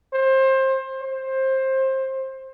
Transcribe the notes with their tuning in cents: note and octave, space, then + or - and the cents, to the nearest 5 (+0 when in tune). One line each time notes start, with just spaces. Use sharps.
C5 +25
C5 +20